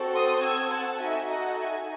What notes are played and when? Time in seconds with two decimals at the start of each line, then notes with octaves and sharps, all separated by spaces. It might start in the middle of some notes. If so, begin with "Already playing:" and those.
Already playing: C4 F#4 A4
0.14 C6 D#6
0.43 E6 G#6
0.72 F#5 A5
1.00 D#4 F#4 A4 E5 G#5
1.30 D#5 F#5
1.58 E5 G#5